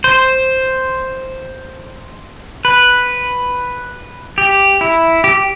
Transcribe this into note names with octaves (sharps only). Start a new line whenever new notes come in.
C5
B4
G4
E4
G4